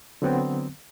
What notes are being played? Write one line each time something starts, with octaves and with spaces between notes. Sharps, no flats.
D3 F#3 B3 C4